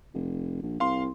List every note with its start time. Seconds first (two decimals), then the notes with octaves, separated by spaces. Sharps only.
0.14 F1
0.62 A#1
0.80 C2 F5 C6